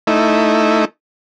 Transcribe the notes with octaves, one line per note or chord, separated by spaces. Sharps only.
A3 D#4 E4